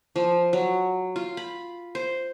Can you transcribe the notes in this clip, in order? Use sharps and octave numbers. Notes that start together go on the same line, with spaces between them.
F3
F#3
F4
B5
C5